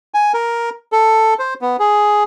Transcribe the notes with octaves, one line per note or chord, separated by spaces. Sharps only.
G#5
A#4
A4
C5
B3
G#4